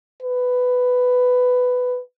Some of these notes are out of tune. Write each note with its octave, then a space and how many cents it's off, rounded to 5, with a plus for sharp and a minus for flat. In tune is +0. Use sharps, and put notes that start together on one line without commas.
B4 +10